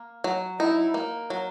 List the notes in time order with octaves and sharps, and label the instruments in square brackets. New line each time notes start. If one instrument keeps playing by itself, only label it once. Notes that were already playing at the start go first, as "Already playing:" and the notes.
Already playing: [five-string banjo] A#3
F#3
[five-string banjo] D#4 [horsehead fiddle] E4
[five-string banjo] A#3
F#3